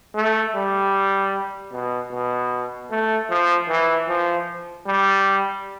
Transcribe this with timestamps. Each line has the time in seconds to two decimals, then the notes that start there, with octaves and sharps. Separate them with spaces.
0.15 A3
0.55 G3
1.72 B2
2.12 B2
2.91 A3
3.30 F3
3.69 E3
4.09 F3
4.87 G3